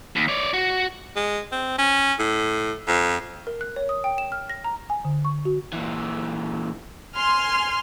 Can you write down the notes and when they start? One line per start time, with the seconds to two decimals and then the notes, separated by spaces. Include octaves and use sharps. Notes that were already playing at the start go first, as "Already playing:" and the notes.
0.16 D#2
0.28 C#5 D5
0.54 F#4
1.16 G#3
1.52 C4
1.78 C#4
2.19 A2
2.88 F2
3.47 A#4
3.61 F#6
3.76 C#5
3.89 D#6
4.04 G5
4.18 E7
4.32 F6
4.49 A#6
4.64 A#5
4.90 G#5
5.05 D3
5.25 C#6
5.45 F#4
5.73 A#2 E3
7.16 G#5 C6 F6